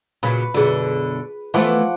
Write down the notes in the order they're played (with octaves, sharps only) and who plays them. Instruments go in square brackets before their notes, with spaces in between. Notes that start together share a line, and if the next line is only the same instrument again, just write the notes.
[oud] A#2 C#3 F#3 [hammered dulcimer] B4 [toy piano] B5
[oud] F#2 B2 D3 [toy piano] F4 G#4
[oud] E3 A3 B3 [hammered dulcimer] F3 F#5 D6